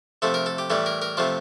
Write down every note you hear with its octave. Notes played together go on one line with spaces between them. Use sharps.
C3 F3 A3 A4
A#4
A4
G4
A2 E3 G3 A4
A#4
A#4
C3 F3 A3 F4